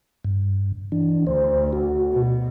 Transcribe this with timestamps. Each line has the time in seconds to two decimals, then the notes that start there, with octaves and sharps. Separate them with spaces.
0.25 G2
0.92 E3 D4
1.27 D2 C5
1.73 F#4
2.12 B2